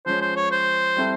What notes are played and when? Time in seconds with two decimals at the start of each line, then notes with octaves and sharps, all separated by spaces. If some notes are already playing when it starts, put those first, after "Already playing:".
0.06 F3 G#3 C#4 C5
0.21 C5
0.36 C#5
0.51 C5
0.96 G3 C4 E4 A4